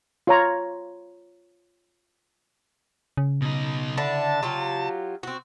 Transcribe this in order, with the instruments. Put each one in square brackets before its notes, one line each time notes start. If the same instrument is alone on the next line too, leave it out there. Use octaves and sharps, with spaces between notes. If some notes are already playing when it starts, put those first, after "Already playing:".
[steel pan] F4 C#5 A#5
[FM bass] C#3
[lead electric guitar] B2 D#4
[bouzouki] D3 D4 E4 [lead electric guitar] A5
[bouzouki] F#3 F4 G4
C4 F#4